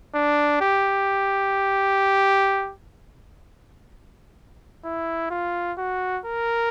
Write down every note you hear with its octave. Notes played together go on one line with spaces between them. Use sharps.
D4
G4
E4
F4
F#4
A#4